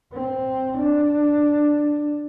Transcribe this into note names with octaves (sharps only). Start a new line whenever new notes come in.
C4
D4